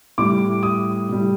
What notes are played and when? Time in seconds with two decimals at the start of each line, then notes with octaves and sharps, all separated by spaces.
0.18 A2 G3 D6
0.63 D#6
1.09 A2 G3